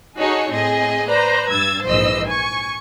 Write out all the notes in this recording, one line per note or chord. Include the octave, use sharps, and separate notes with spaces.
D#4 F#4 G#4 A4 C#5
A2 C4 G#4 D#5
B4 C5 D5 A#5
G2 E6 G#6 A6
A#1 G#2 E3 C5 D#5 E6
G#5 C#6